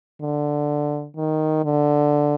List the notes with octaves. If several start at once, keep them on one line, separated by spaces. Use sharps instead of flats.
D3
D#3
D3